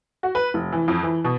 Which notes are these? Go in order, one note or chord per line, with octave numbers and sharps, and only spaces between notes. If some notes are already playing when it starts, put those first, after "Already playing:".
F#4
B4
F1
E3
F2
E3
B2